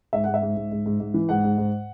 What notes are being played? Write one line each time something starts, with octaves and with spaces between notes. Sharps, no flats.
G#2 E5
G#2 F#5
E5
G#2
G#2
G#2
G#2
G#2
E3
G#2 F#5
G#2
G#2